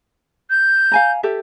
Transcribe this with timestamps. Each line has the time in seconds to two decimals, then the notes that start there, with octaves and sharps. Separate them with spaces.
0.50 G6
0.92 F5 G#5 A#5
1.23 G4 A4 E5